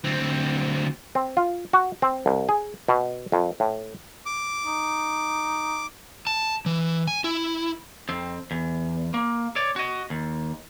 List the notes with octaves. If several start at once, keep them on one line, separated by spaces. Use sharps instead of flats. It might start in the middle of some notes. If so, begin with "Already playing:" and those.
D2 C4
C4
F4
F#4
C4
C2
G#4
B2
F2
A2
D6
D#4
A5
E3
G#5
E4
F2 C4
E2
A#3
C#5 D5
F#4 D#5
D#2